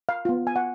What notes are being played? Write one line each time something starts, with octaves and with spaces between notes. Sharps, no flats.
F5
B3 F4
G#5
F#5